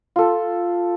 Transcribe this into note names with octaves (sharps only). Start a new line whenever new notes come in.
F4 A4